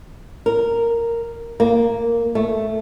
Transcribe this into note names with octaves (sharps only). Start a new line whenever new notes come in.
A#4
A#3
A3